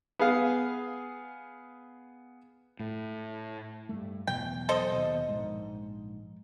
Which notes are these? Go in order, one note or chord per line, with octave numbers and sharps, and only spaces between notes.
B3 G#4 F5
A2
G2 A3
E2 B2 F#3 G5
A4 C5 D#5
D#2 B2
A#1 G#2